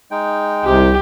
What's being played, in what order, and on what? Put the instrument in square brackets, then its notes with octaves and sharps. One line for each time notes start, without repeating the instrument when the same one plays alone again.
[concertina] G#3 D#4 G5
[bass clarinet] C2 [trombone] C3 [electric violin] G4